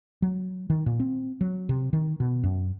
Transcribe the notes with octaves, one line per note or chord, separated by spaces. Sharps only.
F#3
D#3
A#2
C4
F#3
C3
D#3
B2
F#2